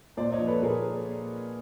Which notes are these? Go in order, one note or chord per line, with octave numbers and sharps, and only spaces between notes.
A#2 C5 D5
C#5 D#5
F3
A4 B4
A#2 G#4 A#4